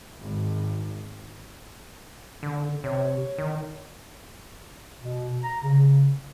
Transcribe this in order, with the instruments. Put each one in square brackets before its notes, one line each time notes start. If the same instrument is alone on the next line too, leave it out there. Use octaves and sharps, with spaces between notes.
[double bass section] G#1
[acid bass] D3
[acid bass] C3 [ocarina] C#5
[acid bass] D#3
[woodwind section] B2
A#5
C#3